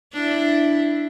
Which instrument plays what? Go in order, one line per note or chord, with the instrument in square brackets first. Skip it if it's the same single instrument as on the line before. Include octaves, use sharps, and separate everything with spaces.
[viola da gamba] D4 E4